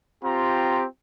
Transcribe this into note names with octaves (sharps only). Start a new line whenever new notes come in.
C4 F4 G4 A#5